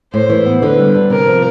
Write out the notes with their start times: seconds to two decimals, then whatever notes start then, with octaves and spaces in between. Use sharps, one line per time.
0.13 A2 C5
0.29 E3
0.46 B3
0.62 D3 B4
0.79 G3
0.95 D4
1.10 C3 A#4
1.27 F3